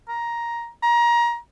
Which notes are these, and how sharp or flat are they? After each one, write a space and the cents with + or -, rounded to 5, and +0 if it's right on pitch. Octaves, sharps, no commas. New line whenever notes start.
A#5 +10
A#5 +25